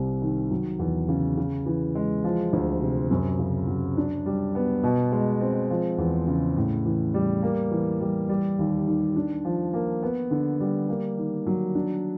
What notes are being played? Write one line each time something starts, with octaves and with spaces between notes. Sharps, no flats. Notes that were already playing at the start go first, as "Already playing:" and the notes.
Already playing: C2 C3
D#3
F#3
E2
C#3
C#3
E3
G#3
F3
D2
C3
F#2
C#3
F#3
D4
G3
B3
B2
G#3
C4
F3
E2
C#3
A2
E3
G3
A#3
E3
G3
G3
D#2
D#3
D4
F3
A#3
B3
D3
G3
A#3
D#3
F#3
D4